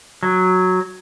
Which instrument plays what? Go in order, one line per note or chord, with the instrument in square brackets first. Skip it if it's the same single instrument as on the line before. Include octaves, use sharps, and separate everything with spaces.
[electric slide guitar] F#3